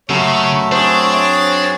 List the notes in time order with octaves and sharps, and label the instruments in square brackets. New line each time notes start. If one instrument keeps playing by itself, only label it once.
[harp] F#2 [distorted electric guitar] C#3 [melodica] A3 E5 [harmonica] C#5
[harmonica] C4 G#4 C#5 [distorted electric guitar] D4 [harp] C5